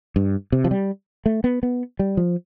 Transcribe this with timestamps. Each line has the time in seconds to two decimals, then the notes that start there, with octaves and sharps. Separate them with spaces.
0.16 G2
0.52 C3
0.64 F3
0.71 G3
1.26 A3
1.44 B3
1.63 B3
1.99 G3
2.17 F3